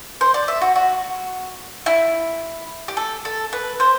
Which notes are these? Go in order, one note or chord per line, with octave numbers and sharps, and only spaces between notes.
C5
D5
E5
F#4
F#4
E4
G4
A4
A4
B4
C5